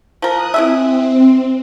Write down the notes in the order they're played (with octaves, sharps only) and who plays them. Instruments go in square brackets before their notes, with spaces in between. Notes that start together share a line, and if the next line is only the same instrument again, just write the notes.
[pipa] F3 A#4 [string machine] D#6 F#6
[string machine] C4 [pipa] E4 G#4 E5